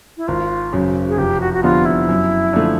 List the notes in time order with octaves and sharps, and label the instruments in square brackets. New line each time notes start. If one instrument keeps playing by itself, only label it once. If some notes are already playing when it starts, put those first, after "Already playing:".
[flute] E4
[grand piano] G#1 [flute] F4
[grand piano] F#2 C#3
[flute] G#4
[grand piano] F1 [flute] G4
[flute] F#4
F#4
[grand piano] F2 D3 G3 B3 [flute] F4
[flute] E4
[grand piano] F#2
D3 F3 A3